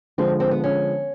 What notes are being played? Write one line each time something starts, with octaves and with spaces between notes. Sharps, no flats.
D3 F3 G#3 C4
C4
B3
C#4